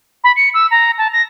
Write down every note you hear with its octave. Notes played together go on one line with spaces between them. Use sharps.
B5
C#7
E6
A#5
A5
A#6